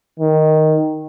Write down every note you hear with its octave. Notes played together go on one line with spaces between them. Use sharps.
D#3